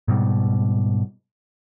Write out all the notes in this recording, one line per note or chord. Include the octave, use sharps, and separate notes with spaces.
G#2 B2 G3